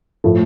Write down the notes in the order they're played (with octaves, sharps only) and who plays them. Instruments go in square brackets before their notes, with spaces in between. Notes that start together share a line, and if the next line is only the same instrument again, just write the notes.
[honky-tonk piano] A2 F3 A3